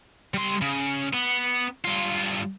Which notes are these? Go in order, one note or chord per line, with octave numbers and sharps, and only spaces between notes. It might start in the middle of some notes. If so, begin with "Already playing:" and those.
G3 C6
C#3
B3
G2 F4